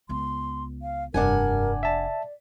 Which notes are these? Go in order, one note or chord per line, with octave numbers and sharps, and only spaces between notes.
C#2 B3 C6
F5
F1 G2 D4 A#4 F#5 G#5
D5 E5 A5